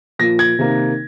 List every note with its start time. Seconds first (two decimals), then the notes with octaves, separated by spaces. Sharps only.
0.19 A#2 F3 A#3 A#6
0.39 G#6
0.59 C3 D#3 A#3